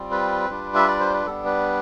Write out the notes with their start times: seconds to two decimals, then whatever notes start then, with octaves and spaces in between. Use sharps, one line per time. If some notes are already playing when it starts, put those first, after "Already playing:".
Already playing: G3 C4 F4
0.11 B4
0.49 G3 D4 F4
0.75 E5
0.88 D5
1.00 C5
1.14 B4
1.26 G3 B3 D4 A4
1.45 B4